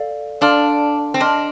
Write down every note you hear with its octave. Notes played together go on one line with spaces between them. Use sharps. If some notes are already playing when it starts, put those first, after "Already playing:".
Already playing: A4 D5 F5
D4 A4 D5 F5 C6 F6
C4
D4 D#5 A5 C6 F6